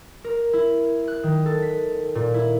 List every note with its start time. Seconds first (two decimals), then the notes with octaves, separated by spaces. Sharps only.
0.24 A#4
0.53 E4
1.08 F#6
1.23 D#3
1.46 A4
1.62 B6
2.15 A#2
2.34 E4